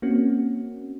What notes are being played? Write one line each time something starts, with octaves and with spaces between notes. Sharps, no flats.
A#3 C4 C#4 F#4